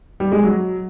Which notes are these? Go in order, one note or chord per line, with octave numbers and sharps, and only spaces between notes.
G3
G#3
F#3